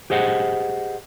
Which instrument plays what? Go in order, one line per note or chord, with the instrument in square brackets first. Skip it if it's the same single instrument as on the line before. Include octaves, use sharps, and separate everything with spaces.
[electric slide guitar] G4 G#4 C5 D#5 F#5